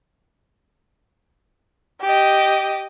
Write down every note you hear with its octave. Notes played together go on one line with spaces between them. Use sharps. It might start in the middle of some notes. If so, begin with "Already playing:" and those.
G4 D#5